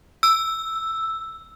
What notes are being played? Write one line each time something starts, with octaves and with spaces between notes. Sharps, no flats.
E6